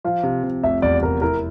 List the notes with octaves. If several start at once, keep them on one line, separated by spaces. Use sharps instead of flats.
F3 F5
C3
C3
F1 E5
E2 D5
F1 A#4
E4 A#4